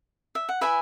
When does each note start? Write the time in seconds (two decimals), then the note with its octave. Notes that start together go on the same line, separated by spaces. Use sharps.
0.35 E5
0.49 F#5
0.61 E4 G#4 B4 E5 G#5